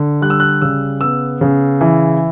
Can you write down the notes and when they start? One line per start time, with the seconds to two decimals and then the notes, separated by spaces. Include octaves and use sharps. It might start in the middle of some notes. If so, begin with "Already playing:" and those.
Already playing: D3
0.22 G3 F#6
0.30 E6
0.40 F#6
0.62 C#3 E6
1.01 B3 E6
1.41 C#3
1.81 E3